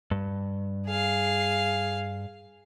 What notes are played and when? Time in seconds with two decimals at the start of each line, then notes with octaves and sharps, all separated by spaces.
0.11 G2
0.87 G#4 F5